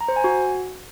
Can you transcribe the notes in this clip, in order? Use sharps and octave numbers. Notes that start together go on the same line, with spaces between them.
A#5
C5
G#5
F#4